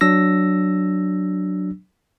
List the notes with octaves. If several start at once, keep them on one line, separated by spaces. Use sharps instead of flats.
F#3 D4 E6 A#6